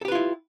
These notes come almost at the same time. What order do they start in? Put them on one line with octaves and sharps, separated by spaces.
A4 G4 B4 F4 E4